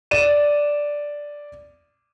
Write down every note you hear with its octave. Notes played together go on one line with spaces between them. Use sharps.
D5 D#7 E7